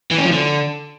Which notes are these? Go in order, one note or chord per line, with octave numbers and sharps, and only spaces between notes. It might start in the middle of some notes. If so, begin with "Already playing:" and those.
E3
C#4
F3
D3